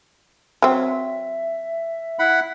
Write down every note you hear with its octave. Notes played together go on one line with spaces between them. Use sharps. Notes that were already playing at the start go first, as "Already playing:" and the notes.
F#3 C4 E5
E4 F#5 B5